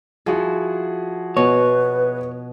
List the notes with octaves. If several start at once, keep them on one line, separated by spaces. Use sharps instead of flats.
F3 E4 F#4 G#4
B2 B4 C#5